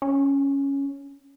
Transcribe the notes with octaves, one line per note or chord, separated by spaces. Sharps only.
C#4